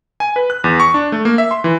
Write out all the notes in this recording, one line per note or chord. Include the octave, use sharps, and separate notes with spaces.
G#5
B4
F#6
E2
C#6
D4
A3
A#3
E5
C6
E3